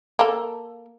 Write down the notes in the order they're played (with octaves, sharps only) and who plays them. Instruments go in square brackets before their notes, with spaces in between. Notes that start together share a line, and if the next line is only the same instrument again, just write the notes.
[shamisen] A#3 A4